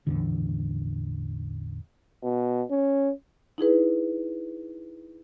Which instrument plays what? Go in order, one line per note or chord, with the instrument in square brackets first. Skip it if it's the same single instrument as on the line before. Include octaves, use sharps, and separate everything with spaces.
[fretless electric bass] A1 E2 D3
[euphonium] B2
C#4
[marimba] D#4 E4 G#4 B4